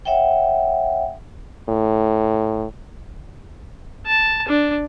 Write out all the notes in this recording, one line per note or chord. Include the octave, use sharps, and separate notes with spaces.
C#5 E5 F#5 G5
A2
A5
D4